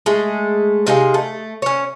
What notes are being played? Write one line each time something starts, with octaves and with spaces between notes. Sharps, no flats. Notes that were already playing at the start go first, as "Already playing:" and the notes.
G#3 A3
C3 D#4 G#4 F5
A3
C#4 C#5